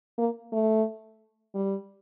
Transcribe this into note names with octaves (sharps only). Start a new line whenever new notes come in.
A#3
A3
G3